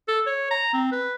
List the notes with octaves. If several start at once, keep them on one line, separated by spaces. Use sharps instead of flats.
A4
C#5
A#5
C4
B4